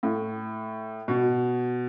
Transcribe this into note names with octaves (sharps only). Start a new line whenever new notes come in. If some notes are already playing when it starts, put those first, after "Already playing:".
A2
B2